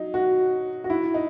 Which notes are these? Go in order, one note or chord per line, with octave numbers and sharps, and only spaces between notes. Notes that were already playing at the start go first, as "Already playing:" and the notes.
Already playing: F#3 D#4
F#4
F#4
E4
D#4